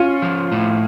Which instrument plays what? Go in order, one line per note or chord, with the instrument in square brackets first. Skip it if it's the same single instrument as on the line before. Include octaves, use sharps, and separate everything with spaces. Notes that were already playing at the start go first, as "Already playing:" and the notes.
Already playing: [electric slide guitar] C#4 [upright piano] F4
[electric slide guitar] F3
A2